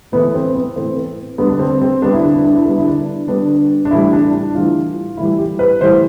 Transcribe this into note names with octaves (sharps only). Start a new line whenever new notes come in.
A2 E3 A3 B3
C4
B3
A2 E3 A3 C4
B3
D3 G3 B3
D4
C4
C4
D3 G3 B3 D4
E4
D4
E4
D4
E4
D3 G3 B3 D4
E4
D4
D3 G3 B3 D4
D4
A2 E3 G3 E4
D4
D4
A2 E3 G3 F4
A2 E3 G3 E4
G4
B4
A2 E3 G3 C5